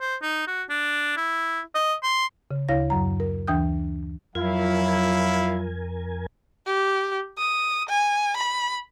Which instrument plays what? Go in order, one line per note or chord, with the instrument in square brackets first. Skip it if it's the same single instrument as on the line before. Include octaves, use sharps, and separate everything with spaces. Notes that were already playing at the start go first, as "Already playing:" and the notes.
[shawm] C5
D#4
F#4
D4
E4
D#5
C6
[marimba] C#3
D2 C#3 E4 C#5 F5 A#6
F#2 F#3 A#5
A#4
D2 E3 D4 G5 D#6 G6
[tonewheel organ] F2 A#4 G#5 [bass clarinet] F#3 [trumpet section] E4 F5 [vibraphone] F4
[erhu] G4
D#6
G#5
B5